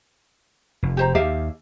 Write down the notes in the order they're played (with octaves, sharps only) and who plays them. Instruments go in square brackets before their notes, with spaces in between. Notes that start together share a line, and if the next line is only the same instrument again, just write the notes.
[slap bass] F1
[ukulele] G4 C5 A#5
[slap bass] D#2 [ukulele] G4 E5 F5